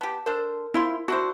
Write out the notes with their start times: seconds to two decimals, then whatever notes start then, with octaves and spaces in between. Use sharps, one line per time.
0.01 B3 G4 A5
0.26 D4 A4 A#4 C5
0.74 F3 E4 F4 C6
1.08 D4 E4 F#4 C5